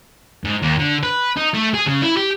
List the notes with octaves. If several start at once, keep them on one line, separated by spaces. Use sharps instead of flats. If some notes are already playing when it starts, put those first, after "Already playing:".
G#2
D#2
D3
B4
D#4
A3
G#4
C#3
E4
G4